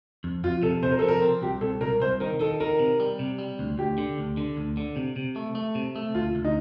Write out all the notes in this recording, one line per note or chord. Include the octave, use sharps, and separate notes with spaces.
F2
F2 F4
C3 A4
C3 C5
A#4
F3 A4
A#4
C4
C2 G4
C2 A4
C2 A#4
C2 C5
D#3 A#4
D#3 A4
D#3 A#4
C3
G3
C3
G3
D2
D2 G4
D3
D2
D3
D2
D3
C3
C3
A3
A3
C3
A3
D2 F4
D2
D#4